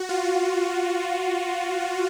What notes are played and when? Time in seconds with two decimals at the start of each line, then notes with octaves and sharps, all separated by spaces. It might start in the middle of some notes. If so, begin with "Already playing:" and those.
Already playing: F#4
0.09 F4